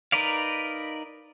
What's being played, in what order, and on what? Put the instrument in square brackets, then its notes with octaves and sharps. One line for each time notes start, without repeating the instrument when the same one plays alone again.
[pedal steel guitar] D#4 A#4 B4 D5 F5